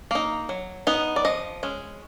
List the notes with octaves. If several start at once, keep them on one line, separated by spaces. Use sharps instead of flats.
A#3 D#4
F#3
B3 D#4
D5
F3 D#5
G#3 C#4